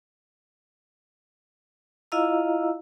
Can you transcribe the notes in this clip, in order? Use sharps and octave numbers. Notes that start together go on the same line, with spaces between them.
E4 F4 D#5 F5 A#5 E6